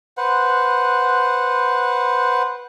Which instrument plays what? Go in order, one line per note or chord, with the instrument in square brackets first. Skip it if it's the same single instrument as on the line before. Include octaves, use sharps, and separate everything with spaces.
[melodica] B4 C5 F#5